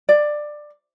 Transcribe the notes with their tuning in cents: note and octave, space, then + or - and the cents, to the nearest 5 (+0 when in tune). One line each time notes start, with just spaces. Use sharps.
D5 +15